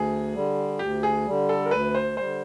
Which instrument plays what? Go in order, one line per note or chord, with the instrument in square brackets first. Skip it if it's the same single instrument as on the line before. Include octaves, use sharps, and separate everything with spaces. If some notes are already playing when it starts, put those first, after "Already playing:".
Already playing: [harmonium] D2 [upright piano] G#4
[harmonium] D3 G3
[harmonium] D2 [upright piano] G4
[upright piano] G#4
[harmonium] D3 G3
[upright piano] A4
A#4
[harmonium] D2 [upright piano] B4
[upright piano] C5
[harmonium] D3 G3 [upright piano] C5